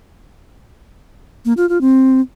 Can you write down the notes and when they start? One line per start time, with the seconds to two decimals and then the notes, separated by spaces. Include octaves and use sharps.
1.45 A#3
1.57 F4
1.69 F4
1.81 C4